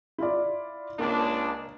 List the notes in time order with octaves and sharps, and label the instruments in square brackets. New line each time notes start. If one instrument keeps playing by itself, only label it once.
[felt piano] E4 F4 D5
[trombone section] C#2 D4 [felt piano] A#3